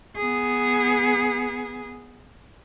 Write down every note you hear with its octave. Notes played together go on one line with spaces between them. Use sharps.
B3 G#4